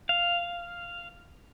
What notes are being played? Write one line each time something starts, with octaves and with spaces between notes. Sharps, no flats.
F5